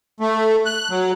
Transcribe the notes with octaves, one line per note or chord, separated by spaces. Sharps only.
A3
F#6
F#3